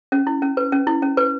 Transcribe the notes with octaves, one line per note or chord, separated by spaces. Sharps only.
C#4
E4
C#4
B4
C#4
E4
C#4
B4